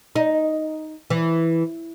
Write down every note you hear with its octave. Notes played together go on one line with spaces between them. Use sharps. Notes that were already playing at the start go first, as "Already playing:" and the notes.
D#4
E3